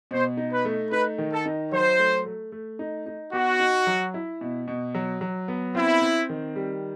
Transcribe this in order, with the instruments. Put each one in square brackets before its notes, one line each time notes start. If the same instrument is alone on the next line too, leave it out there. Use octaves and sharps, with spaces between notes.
[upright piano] B2 [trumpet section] C5
[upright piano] D#4
[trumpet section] B4
[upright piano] A3
[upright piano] D#4 [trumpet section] B4
[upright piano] D#3
[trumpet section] A4
[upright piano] D#4
[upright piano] F#3 [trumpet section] C5
[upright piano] A3
A3
A3
D#4
D#4
[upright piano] B3 [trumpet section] F#4
[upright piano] D#4
F#3
E4
B2
B2
F#3
F#3
B3
[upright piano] C4 [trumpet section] E4
[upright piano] C4
D#3
G3